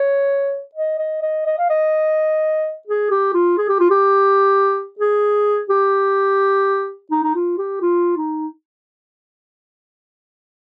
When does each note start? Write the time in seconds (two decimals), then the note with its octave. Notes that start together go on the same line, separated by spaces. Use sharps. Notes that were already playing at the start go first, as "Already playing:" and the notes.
Already playing: C#5
0.75 D#5
0.99 D#5
1.22 D#5
1.46 D#5
1.58 F5
1.70 D#5
2.88 G#4
3.11 G4
3.34 F4
3.58 G#4
3.69 G4
3.80 F4
3.91 G4
4.99 G#4
5.70 G4
7.11 D#4
7.24 D#4
7.35 F4
7.58 G4
7.82 F4
8.17 D#4